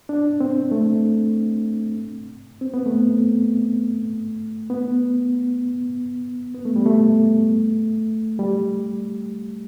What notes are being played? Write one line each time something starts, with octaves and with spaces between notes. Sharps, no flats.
D4
C4
A3
C4
B3
A3
B3
B3
A3
G3
A3
G3